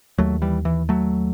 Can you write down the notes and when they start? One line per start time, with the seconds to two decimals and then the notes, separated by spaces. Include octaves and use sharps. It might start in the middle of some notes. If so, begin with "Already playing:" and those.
0.18 D#2 F#3 A3
0.42 E3 G3
0.65 E3
0.89 F#3 A3